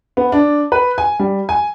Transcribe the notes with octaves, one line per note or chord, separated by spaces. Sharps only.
B3
D4
B4
G#5
G3
G#5